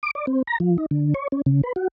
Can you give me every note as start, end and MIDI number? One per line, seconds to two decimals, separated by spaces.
0.03 0.11 86
0.15 0.26 74
0.27 0.42 60
0.47 0.58 82
0.60 0.77 53
0.78 0.86 63
0.91 1.14 50
1.14 1.28 73
1.32 1.42 61
1.46 1.61 49
1.63 1.73 71
1.76 1.88 66